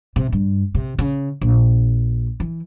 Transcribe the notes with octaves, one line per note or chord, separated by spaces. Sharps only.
C3
G2
C3
C#3
A#1
E3